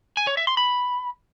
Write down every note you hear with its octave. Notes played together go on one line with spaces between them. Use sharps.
G#5
C#5
E5
C6
B5